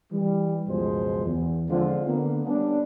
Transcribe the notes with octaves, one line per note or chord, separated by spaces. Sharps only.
E3 G3
C#2 F#2 B2 F3 G#3 C5
E2
D3 F3 G#3 C4 F4
D3 A#3 B3
G3 B3 C#4 D4